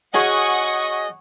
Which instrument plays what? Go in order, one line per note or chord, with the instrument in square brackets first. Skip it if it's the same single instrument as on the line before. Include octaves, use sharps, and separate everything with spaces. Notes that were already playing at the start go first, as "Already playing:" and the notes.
[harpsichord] C#4 F#4 G#4 [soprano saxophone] D#5 [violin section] F#5 C#6 D#6